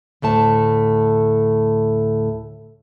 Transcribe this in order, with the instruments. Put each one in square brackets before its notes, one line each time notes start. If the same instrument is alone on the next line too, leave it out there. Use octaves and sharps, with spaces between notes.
[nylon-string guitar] D2 A2 A3 A5